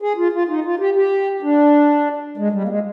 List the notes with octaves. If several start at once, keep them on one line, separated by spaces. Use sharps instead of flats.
G#4
F4
F4
D#4
F4
G4
G4
D4
G#3
G3
A#3
G#3